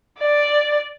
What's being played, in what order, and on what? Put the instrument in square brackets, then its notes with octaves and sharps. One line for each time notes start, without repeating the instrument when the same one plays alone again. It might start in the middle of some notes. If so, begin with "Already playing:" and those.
[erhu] D5